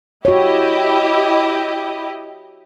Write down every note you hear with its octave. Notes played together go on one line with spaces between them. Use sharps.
E4 F#4 G4 C#5 D#5